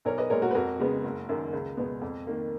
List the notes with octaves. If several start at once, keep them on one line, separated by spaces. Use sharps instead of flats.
B1 A#4 C#5
B4 D#5
A#2 G#3 A#4 C#5
F#4 A#4
B4
F2 F#4 A#4
C#3 G#3 B3
F#1
F#2 D#3 A#3
C#2
B2 G#3 B3
F2
D#3 A#3